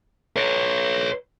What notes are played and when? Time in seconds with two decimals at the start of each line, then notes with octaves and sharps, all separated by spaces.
0.36 B4 C#5